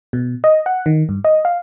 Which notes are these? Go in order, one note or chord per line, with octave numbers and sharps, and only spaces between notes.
B2
D#5
F#5
D#3
G2
D#5
F5